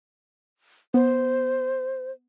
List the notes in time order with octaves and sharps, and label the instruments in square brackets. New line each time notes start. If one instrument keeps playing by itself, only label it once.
[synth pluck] B3 [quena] C5